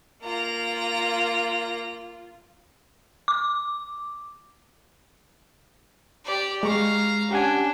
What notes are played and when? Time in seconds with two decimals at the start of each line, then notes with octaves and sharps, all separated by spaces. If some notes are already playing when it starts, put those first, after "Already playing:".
0.23 A#3 F4 A#5
3.28 D6
6.25 G4 D5
6.63 G#3 F5 A#5 C#6
7.31 C#4 D4 G4 F#5 G#5